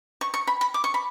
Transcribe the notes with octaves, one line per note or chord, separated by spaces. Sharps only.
C#6
C#6
B5
B5
D6
C#6
B5